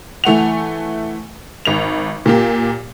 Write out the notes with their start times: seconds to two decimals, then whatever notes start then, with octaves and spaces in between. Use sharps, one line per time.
0.24 E3 A3 F#5 F7
1.65 G#1 F7
2.26 A#2 A#3 G4